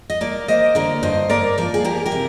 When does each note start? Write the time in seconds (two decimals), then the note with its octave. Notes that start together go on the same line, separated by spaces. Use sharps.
0.10 D#5
0.21 A#3 A#4 D5
0.48 A#3 C5 D#5
0.75 D3 A#4 D5
1.03 G2 C5 D#5
1.29 A#3 A#4 D5
1.58 F3 A#4 D5
1.74 G#4
1.84 A#3 G4 A#4
2.06 G4 A#4
2.12 C3